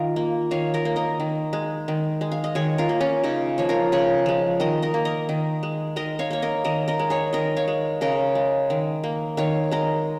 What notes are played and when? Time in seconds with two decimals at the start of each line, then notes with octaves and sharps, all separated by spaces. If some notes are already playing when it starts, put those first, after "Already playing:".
Already playing: D#3 F4 A#4
0.16 A#3
0.51 D#3 C#5 F5
0.74 A#4 D#5
0.85 A#3
0.96 A#4 D#5
1.20 D#3
1.53 G#3
1.88 D#3
2.21 G#3
2.32 F5
2.44 D#5
2.55 D#3 G#4 C#5
2.78 F4 A#4
2.89 A#3
3.00 C#4 F4
3.24 C#3 D#4
3.58 F3 A#3 C#5
3.69 F4 A#4
3.92 C#3 G#4 C#5
4.26 F3 G#3
4.60 D#3 A#4 D#5
4.82 A#4 D#5
4.94 A#3
5.05 A#4 D#5
5.29 D#3
5.63 G#3
5.96 D#3 A#4 D#5
6.19 C#5 F5
6.31 A#3 C#5
6.42 A#4 D#5
6.64 D#3 A#4 D#5
6.88 A#4 D#5
6.99 G#3
7.10 G#4 C#5
7.33 D#3 A#4 D#5
7.57 C#5 F5
7.68 G#3
8.01 C#3 A#4 D#5
8.35 G#3
8.70 D#3
9.04 A#3
9.37 D#3 C#5 F5
9.71 G#3 A#4 D#5